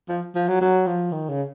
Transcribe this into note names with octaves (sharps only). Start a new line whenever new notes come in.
F3
F3
F#3
F#3
F3
D#3
C#3